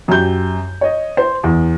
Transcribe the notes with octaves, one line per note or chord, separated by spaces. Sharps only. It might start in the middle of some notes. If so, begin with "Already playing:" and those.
F#2 G4 G6
C#5 D#5
C5
E2